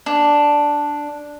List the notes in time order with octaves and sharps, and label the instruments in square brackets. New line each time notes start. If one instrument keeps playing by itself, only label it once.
[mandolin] D4